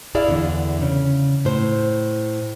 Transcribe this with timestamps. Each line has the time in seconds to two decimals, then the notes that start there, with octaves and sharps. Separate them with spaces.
0.15 E4 G#4 D5 E5 F5
0.29 E2 D3
0.82 C#3
1.45 A2 C5